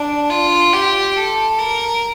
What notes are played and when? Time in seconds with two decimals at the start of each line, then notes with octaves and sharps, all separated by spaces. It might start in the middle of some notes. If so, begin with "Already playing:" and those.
Already playing: D4
0.30 F4
0.73 G4
1.17 A4
1.59 A#4